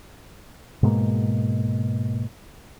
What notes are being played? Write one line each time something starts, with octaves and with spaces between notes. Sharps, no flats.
G#2 B2 G#3 A#3